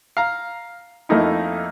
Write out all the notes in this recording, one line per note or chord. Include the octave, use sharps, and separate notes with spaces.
F5 A#5
F2 A3 A#3 D#4 E4